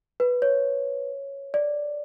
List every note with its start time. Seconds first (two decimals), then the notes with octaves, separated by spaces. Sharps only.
0.20 B4
0.42 C#5
1.54 D5